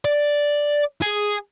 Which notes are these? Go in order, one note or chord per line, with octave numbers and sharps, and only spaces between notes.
D5
G#4